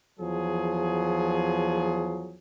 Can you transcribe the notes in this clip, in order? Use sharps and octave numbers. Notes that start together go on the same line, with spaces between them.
E2 F3 F#3 G#4